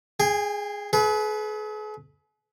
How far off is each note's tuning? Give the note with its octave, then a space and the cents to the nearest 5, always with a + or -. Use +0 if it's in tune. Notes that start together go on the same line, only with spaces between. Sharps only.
G#4 +0 G5 +45
G#4 +45 B4 +0